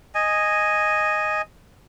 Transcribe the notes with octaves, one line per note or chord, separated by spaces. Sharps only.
D#5 G#5